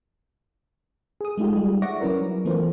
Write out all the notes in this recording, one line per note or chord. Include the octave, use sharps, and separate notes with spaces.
G#4 D#6
G#3 A3 D#4 F4 G4
G3 G#4
D5 E5 F#5 C#6 D6 A#6
F#3 C#4 E4 A#4 B4
E3 A3 B3 F4 A#4 C5